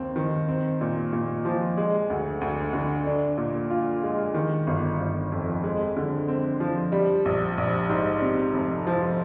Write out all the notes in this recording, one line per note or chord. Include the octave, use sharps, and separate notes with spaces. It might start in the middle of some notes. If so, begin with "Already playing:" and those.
Already playing: D#2 C4
D#3
C4
A#2
A#2
F3
G#3
D2
D2
D3
D4
A#2
F4
G#3
D#3
G1
G1
F2
G#3
D3
C4
F3
G3
A#1
A#1
G#2
C3
F1
F3